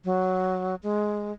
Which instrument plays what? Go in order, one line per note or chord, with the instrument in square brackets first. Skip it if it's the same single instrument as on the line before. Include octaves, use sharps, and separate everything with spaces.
[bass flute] F#3
G#3